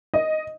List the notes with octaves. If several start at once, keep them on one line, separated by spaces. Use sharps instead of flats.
D#5